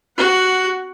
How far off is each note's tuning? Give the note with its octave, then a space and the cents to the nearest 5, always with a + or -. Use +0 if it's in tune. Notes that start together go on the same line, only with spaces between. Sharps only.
F#4 +10 F#5 +0